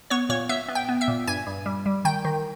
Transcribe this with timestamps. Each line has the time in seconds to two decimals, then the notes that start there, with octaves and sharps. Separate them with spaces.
0.10 B3 C#5 C#6
0.29 A#2 C#5 C#6
0.49 B3 E5 E6
0.68 B3
0.75 G5 G6
0.89 B3
1.01 E5 E6
1.08 A#2
1.27 G2 G#5 G#6
1.47 G2
1.66 G3
1.86 G3
2.05 D#3 G5 G6
2.25 D#3